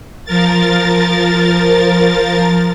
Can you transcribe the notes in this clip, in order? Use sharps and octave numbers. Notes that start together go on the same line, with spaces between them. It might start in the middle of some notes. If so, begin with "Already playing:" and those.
F3 A#4 A6